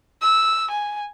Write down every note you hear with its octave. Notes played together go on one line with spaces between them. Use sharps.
E6
G#5